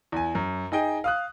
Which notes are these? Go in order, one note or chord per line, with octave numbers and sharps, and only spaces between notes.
E2 G#5
F#2
D#4 G#4 D#5 G5
F5 D#6 F#6